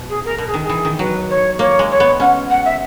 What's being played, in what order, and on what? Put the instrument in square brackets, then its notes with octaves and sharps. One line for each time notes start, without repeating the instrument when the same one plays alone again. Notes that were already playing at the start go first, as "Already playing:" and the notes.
Already playing: [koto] B2
[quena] G#4
A#4
[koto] B2 [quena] A#4
[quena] G#4
[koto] D#3
[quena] G#4
[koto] E3
D#3
[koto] F#3 [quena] B4
[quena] C#5
[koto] A#3 [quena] C#5
[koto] G#3
[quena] C#5
[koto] B3
[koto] C#4 [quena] F#5
[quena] F#5
E5